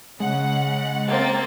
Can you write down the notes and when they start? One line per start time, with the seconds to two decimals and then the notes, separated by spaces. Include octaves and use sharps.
0.20 C#3 G#3 F#5
1.07 A#3 C4 A6